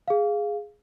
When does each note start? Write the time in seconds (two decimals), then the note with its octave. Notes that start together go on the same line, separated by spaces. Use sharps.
0.08 G#4 F5